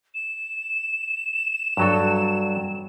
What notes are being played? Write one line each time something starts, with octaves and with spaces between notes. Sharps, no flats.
E7
G2 F#3 A4